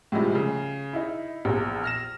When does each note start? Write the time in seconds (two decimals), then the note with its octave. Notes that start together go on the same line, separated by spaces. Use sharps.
0.12 A2 C3 F3 G3 G#3
0.35 C#3
0.93 D#4 E4
1.45 A#1 E2
1.84 F6 A#6 E7